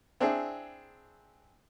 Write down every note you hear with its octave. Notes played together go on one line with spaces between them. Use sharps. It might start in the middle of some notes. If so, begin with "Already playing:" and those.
C4 D4 E4 G#4